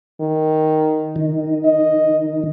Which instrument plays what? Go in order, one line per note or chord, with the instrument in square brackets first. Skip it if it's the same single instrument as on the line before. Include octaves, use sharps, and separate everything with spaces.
[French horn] D#3
[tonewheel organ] D#3
[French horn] D#5